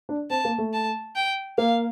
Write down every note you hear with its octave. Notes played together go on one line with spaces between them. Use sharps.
D4
C4 A5
A#3
A3
A5
G5
A#3 F5